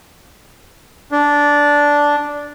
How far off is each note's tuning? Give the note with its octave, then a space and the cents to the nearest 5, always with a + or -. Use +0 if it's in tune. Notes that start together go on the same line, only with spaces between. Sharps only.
D4 -10